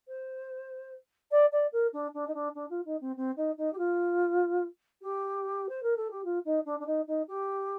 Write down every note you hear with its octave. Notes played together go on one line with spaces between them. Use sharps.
C5
D5
D5
A#4
D4
D4
D#4
D4
D4
F4
D#4
C4
C4
D#4
D#4
G4
F4
G4
C5
A#4
A4
G4
F4
D#4
D4
D4
D#4
D#4
G4